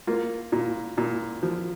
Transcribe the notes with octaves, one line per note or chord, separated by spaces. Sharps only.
A#3 F4
A#2
A#2
F3